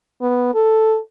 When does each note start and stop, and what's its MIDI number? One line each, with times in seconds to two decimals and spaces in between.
0.22 0.51 59
0.55 0.98 69